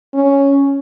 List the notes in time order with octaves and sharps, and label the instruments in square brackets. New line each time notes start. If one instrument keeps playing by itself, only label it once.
[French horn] C#4